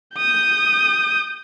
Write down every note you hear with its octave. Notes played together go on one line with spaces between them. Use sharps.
D#6 G6